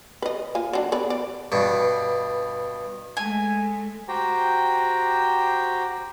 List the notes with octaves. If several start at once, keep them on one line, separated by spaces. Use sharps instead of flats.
B4 D#5
A#3 F4 G#5
F#3 D4
B3 B4 D5
D5
G2 B2
G#3 A3 G#5
F#4 G4 C5 G5 A#5